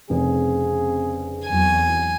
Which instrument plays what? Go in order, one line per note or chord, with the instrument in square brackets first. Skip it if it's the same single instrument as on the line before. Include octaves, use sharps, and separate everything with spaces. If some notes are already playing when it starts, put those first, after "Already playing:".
[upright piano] F1 [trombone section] C#3 C4 G#4
[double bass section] E2 F#3 [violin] G#5